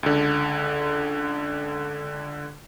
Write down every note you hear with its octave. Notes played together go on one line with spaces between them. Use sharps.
C#2 D3